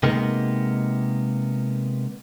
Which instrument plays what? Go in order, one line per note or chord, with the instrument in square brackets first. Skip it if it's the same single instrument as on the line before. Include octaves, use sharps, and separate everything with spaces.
[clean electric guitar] C3 G#3 A#3 B3 D#4